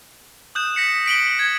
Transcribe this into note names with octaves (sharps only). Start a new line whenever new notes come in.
D#6 F#6 G6 E7
A#6 B6 C#7
B6 D7 F#7 G7
G#6